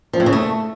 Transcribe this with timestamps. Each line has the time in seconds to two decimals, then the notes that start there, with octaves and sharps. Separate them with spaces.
0.13 F3
0.20 A2
0.26 C#3
0.33 A3